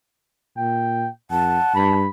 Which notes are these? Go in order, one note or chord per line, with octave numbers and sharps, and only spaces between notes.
A#2 G5
F2 F#5 A5
G2 B5